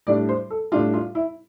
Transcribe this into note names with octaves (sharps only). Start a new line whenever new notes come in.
A2 G3 D4 D5
C5
A4
A2 G3 D4 F4
F4
E4